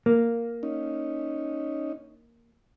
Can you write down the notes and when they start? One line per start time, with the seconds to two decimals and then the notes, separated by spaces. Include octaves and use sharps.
0.06 A#3
0.63 C#4 D#4